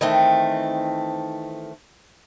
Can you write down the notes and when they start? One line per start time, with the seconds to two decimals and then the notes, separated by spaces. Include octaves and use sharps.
0.01 D#3 E3 A3 C4